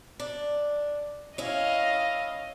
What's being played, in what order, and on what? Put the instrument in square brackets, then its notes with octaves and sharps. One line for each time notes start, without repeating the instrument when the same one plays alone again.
[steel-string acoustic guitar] D4
[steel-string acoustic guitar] C#4 E4 [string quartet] D#5 F5